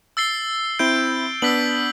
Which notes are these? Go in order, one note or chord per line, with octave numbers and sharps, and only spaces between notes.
E6 A6 C7 G7
C4 E4 G6 D7 G7
B3 D4 E6 B6 F#7